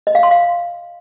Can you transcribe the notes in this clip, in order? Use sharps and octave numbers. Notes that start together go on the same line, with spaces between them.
D#5
F5
C6
F5